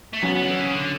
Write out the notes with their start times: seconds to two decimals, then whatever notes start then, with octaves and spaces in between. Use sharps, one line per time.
0.13 A3
0.22 F#3 B3 C#4 F#4
0.35 B3
0.42 D3
0.48 E3
0.60 C#3
0.73 D3